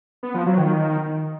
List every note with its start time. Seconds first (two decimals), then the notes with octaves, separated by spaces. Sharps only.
0.23 B3
0.34 F3
0.46 F#3
0.58 D#3